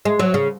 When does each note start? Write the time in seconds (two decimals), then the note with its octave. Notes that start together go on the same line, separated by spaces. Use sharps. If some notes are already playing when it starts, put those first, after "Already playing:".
0.05 G#3
0.19 F#3
0.34 C#3